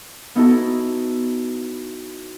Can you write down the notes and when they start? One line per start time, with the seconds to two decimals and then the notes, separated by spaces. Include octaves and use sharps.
0.36 B3 D#4 E4 F#4 A4